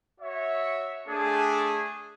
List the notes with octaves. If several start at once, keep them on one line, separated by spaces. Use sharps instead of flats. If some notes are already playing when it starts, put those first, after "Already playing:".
F#4 C#5 E5
A3 D4 G#4